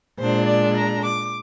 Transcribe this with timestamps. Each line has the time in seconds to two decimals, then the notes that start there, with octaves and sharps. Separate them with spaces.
0.19 A#2 G#3 D4 C5
0.48 D5
0.77 A#5
1.05 D6